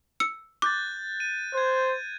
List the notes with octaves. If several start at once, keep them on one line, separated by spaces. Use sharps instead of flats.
E6 C#7
D6 F#6 G6 A6
D#7
C5 F#6 G#6